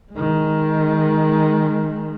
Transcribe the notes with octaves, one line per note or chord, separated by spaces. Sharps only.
D#3 G#3